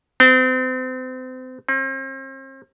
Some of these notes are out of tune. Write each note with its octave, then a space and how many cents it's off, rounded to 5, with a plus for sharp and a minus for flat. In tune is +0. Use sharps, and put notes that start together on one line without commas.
C4 -35
C4 +40